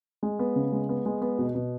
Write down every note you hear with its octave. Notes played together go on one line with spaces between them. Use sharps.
G#3
B3
C#3
G#3
B3
G#3
B3
B2
B2